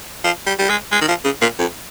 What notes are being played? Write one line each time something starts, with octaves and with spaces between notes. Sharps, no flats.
F3
G3
G3
G#3
G#3
D#3
F3
C#3
A#2
F2